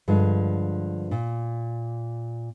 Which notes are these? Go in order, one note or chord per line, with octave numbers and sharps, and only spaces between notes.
G2 D3 F3 G#3
A#2